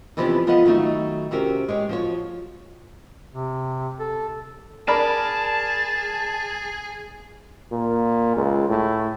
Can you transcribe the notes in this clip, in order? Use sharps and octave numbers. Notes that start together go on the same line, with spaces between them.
C3 E3 F3 B3 D4 G4
F3 B3 A4 D#5 F5 F#5
D#3 F#3 A3 D#4
C3 C4 C#4 F#4 G4 A#4
G#3 G4 C#5
F3 F#4 C#5
C3
A4
G#4 A#4 D5 A5 B5
A#2
C#2
A2